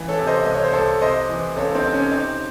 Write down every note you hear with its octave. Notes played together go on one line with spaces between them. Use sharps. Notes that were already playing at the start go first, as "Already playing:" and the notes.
Already playing: C#2 E3
A4 C#5
C3
C5 D#5
C2 D#5
C#5
C5
C2 A4 C#5
C3 C5 D#5
E3
C#2 A4 C#5
C4 D#4
C3
C#4
C3 C4 D#4